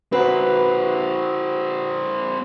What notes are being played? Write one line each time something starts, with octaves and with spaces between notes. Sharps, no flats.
C4 F#4 A#4 B4 F#5